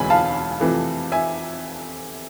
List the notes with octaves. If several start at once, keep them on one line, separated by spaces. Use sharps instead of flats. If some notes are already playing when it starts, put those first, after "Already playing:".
Already playing: E1 D2 C3 E3 G#3 G#5 B5
F5 A5
F2 C3 E3 A3
E5 G#5